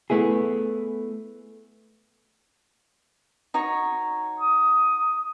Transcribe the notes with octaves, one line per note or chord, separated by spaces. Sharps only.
A3 B3 E4 G#4
D#4 F#4 C#5
D#6